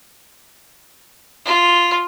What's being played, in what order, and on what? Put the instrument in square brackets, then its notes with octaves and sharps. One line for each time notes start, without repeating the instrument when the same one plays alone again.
[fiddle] F4